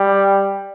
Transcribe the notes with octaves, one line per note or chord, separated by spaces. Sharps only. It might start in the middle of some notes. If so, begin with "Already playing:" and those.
Already playing: G3